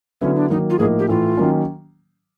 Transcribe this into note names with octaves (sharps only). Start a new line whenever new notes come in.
D3 F#3 B3 C#4 E4
D4
D#3 F#3 A#3 D#4
F4
A2 F3 A#3 D#4 G#4
G4
A2 E3 A3 F4
D#3 F#3 A#3 C#4